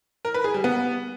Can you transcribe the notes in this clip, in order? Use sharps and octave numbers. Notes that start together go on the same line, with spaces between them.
A#4
B4
G#4
G3
B3